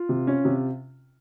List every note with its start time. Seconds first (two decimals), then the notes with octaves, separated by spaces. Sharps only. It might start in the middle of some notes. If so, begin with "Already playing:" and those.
Already playing: F4
0.09 C3
0.27 C#4
0.45 C3